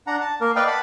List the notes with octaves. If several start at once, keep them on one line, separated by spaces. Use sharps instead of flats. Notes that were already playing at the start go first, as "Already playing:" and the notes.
D4 F#5 A#5
A5
A#3 A#4
B4 D5 D#5 F5 G5
F#5 A5 B5